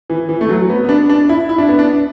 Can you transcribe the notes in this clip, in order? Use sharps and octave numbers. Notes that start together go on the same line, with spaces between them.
E3
E3
A3
F#3
B3
B3
D4
D4
E4
E4
D4
B3
D4